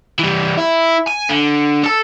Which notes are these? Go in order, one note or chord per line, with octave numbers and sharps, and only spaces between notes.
E3 G3
E4
G#5
D3
A4 A5